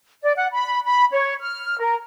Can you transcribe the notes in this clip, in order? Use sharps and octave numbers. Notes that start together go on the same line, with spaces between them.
D5
F#5
B5
B5
C#5
F6
A#4